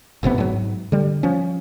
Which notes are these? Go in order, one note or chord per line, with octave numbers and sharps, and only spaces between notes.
E1 A1 C3 B3
G#2 F#3
D3 G3
F3 C#4